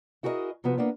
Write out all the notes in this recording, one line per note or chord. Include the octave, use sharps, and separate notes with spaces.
E4 F#4 G#4 A#4 B4 D#5
C3 F3 B3 F#4
A#3 B3 D4